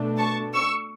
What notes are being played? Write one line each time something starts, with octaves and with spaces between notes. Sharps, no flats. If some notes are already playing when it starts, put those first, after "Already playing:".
Already playing: B2 A3 D4
A5 C#6
C#6 E6